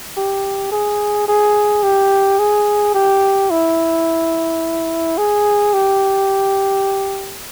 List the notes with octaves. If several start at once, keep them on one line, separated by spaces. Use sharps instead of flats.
G4
G#4
G#4
G4
G#4
G4
E4
G#4
G4